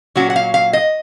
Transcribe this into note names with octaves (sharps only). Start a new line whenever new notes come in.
A#2 F#3 C#4 F#4
F#5
F5
F5
D#5